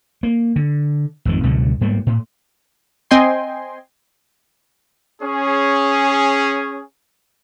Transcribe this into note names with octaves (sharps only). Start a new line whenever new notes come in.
A#3
D3
G#1 F2 D#3
C#2 B2 D3 F#3
G#2 G3 A#3 B3
A2
C4 D#5 G5 G#5 C6
C#4 G#4